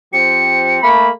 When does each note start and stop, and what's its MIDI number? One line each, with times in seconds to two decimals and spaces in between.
0.13 0.82 53
0.13 0.82 60
0.13 0.82 67
0.13 0.88 97
0.83 1.09 57
0.83 1.09 58
0.83 1.08 83